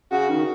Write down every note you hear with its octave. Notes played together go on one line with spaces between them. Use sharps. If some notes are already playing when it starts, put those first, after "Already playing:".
C#3 F#4
D#3